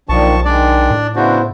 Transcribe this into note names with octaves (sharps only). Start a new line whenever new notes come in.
B1 A#2 D#3 F3 D4 A5 C#6
D#3 G#3 D4 D5
A2
C#3 B3 D4 E4 F#4 C5